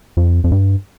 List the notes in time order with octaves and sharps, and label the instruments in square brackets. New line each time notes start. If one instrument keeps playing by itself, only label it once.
[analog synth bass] F2
F2
G2